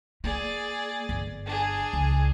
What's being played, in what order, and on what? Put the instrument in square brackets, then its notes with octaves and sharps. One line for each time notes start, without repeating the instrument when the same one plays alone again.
[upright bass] A#3 [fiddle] G#4 D5
[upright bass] G1
[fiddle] D4 G#4
[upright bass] C#2